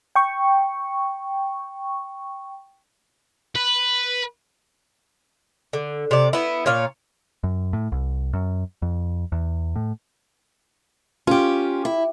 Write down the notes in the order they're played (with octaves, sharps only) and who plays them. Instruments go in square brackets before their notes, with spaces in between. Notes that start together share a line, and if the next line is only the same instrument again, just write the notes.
[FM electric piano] G5 C#6
[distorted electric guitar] B4
[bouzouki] D3
C3 D5
B3 E4
A#2 C#5 F5
[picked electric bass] F#2
A2
C2
F#2
F2
E2
A2
[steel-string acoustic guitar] C#4 G4 [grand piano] F4
[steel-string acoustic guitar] E4